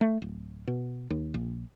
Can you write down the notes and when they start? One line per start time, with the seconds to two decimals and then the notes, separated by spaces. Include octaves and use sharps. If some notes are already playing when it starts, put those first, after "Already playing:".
0.01 A3
0.22 D1
0.67 B2
1.10 D#2
1.34 A#1